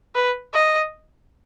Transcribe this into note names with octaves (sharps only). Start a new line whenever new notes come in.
B4
D#5